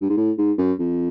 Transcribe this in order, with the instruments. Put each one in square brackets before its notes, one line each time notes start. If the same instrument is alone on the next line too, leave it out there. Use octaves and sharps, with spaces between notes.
[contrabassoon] G2
G#2
A2
G#2
F#2
F2